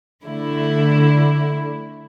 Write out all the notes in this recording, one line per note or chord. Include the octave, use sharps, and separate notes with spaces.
D3 A3 E4